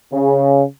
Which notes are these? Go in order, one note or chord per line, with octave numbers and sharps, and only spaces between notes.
C#3